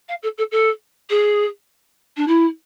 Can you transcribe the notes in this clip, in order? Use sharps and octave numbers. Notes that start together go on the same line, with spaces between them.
F5
A4
A4
A4
G#4
D4
E4